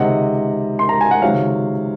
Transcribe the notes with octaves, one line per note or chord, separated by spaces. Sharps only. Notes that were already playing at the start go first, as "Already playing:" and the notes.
Already playing: C#2 C3 D#3 D#5 F#5
C6
A#5
G#5
F#5
C#2 C3 D#3 F#3 C#5 F5